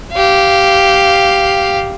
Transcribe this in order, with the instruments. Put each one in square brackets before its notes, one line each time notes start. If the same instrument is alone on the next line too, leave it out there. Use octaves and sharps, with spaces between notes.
[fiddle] G4 F5